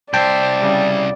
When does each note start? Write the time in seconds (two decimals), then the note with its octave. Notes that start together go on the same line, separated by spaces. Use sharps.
0.14 C2 C5 D5 E5 G5 A5
0.59 C#3 G3